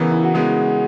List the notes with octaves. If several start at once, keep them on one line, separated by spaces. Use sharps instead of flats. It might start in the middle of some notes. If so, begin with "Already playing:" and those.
Already playing: C#3 E3 B3 A#4
E4
F#4
C#3 G#3 B3 G#4